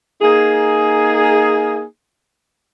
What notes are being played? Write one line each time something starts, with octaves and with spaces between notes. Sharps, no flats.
A#3 D#4 G#4